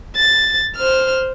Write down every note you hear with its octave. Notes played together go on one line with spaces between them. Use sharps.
A6
C5 F6